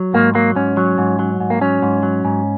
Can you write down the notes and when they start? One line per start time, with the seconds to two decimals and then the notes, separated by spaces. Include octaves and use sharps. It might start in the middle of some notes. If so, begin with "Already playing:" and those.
Already playing: F#3
0.14 G#2 A#3
0.35 F#3 A#3
0.56 G#2 C#4
0.77 F#3
0.98 G#2
1.19 F#3
1.40 G#2
1.50 A#3
1.61 F#3 C#4
1.82 G#2
2.03 F#3
2.25 G#2